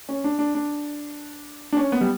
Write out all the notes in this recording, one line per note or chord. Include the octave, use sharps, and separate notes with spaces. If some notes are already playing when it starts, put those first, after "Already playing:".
C#4
D4
D4
D4
D4
C#4
B3
G3